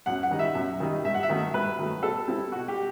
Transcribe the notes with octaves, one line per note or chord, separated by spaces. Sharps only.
F#2 F#5
F#5
D#3 G3 D#4
E5
F#2
D#3 G3 D#4
G2 E5
F#5
E5
D#3 F#3 A3
G2 B4
D#3 F#3 A3
B2 A4
G3 C4 E4
B2 F#4
G4